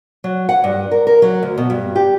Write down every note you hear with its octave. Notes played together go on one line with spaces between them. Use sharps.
F#3
F#5
G2
A#4
A#4
F#3
D2
B2
G2
G4